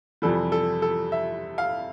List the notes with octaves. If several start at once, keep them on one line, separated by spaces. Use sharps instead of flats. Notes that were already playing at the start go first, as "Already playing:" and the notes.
F2 C3 E3 G3 A4
A4
A4
E5
F5